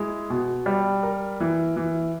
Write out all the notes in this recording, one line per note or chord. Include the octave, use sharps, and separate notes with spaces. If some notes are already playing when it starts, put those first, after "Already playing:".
Already playing: G#3 E4
B2
G3
A#4
E3
E3